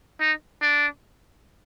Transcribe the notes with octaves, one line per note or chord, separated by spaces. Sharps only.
D#4
D4